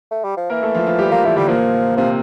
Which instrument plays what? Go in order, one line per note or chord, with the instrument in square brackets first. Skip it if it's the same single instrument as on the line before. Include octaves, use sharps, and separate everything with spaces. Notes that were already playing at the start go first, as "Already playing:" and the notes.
[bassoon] A3
G3
F3
[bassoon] E3 [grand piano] A#3 A#4
[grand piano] A3 A4
F3 F4
F3 F4
G3 G4
[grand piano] F3 F4 [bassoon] A#3
[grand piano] E3 E4 [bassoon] A3
[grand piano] D3 D4 [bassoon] G3
[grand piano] A#2 A#3 [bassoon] F3
[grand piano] C3 C4 [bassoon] F3